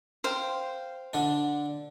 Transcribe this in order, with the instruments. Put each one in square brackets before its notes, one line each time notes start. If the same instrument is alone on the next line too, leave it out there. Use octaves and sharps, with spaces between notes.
[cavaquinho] C5 F5 G5
[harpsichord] D3 D4